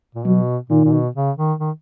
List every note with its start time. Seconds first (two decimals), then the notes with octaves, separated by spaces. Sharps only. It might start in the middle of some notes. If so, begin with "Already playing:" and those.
0.15 A#2
0.25 B2 F#3
0.70 A#2 D#3
0.85 A#2
0.92 B2
1.15 C#3
1.37 D#3
1.60 D#3